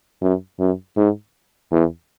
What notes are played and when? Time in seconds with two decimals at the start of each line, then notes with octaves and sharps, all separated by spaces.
0.22 F#2
0.59 F#2
0.97 G#2
1.72 E2